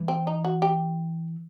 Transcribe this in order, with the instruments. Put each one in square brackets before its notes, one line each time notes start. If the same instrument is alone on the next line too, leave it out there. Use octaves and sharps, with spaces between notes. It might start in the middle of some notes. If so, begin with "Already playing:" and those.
Already playing: [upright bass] E3
[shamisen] C4
D#4
F#4
G4